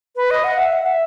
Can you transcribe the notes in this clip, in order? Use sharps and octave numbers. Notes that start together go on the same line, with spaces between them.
B4
D#5
F#5
E5
F#5
E5